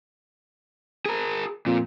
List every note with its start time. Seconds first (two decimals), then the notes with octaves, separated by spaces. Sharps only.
1.06 G#4 A#4
1.66 F2 A#2